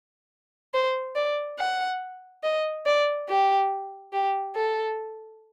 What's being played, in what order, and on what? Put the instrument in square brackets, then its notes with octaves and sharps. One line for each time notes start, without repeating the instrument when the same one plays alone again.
[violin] C5
D5
F#5
D#5
D5
G4
G4
A4